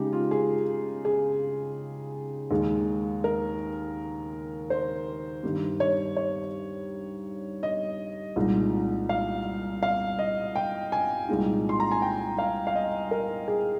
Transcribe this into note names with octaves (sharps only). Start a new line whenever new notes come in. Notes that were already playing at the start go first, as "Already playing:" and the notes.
Already playing: C#3 G#3 D#4 G4
F4
G#4
G#4
D#2 D#3 G#3
A#4
C5
G2 D#3 G3
C#5
C#5
D#5
C2 A#2 G#3 D#4
F5
F5
D#5
G5
G#5
C2 A#2 G#3 D#4
C6
A#5
G#5
G5
F5
F5
D#5
A#4
G#4